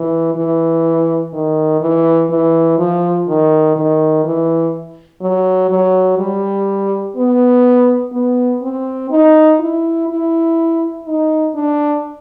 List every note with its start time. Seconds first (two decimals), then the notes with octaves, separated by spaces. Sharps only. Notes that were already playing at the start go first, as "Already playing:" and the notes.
Already playing: E3
0.35 E3
1.33 D#3
1.81 E3
2.30 E3
2.78 F3
3.28 D#3
3.76 D#3
4.24 E3
5.21 F#3
5.70 F#3
6.19 G3
7.17 B3
8.13 B3
8.62 C4
9.11 D#4
9.60 E4
10.08 E4
11.05 D#4
11.55 D4